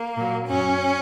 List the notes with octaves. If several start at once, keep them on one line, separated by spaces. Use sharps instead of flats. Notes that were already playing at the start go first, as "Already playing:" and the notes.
Already playing: A#3
A#2 F#3
F#2 F#3 C#4